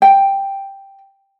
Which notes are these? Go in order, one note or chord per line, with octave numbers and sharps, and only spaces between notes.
G5